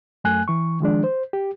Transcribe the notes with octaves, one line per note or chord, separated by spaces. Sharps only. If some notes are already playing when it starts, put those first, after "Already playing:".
F#2 A3 G#5 F#6
E3 C#6
D#3 F3 G#3 D4
C5
G4